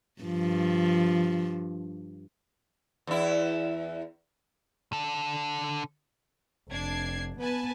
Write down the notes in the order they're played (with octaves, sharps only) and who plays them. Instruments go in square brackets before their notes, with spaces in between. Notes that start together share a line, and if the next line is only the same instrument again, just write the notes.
[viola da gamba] G2 F3
[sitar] E2 E4
[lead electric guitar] D3 A4
[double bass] F1 [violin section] D4 G#6 C7
[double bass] B3 [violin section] B4 G#5 A5